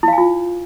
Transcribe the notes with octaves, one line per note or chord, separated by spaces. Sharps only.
E4 F4 F5 G#5